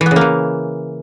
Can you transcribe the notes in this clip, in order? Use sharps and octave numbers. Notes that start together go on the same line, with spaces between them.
E3
B3
C#3
A#3
E3